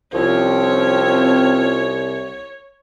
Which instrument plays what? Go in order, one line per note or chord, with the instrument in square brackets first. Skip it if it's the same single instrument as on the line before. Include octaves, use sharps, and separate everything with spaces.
[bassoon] C2 [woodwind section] F3 C4 C#4 [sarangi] C#5